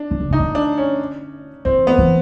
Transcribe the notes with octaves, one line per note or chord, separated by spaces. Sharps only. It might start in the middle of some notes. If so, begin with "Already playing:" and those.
Already playing: D4
D#3
D3
C#3 D#4
D3
D4
C#4
E3 C4
B3
E3